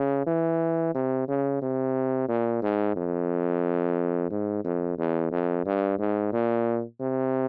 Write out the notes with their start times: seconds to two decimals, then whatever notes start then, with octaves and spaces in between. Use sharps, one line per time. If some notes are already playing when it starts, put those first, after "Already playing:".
Already playing: C#3
0.26 E3
0.95 C3
1.28 C#3
1.62 C3
2.29 A#2
2.62 G#2
2.96 F2
4.31 G#2
4.65 F2
4.98 E2
5.32 F2
5.66 G2
5.99 G#2
6.33 A#2
7.00 C3